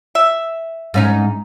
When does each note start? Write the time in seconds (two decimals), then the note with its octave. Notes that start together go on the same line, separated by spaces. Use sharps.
0.15 E5
0.94 G#2 C#4 D#4